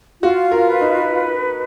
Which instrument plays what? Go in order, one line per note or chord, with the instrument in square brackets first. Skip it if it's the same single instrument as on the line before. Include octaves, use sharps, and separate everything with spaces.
[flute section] F4 [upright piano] F#4
[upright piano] A#4
[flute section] B4
[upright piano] D#4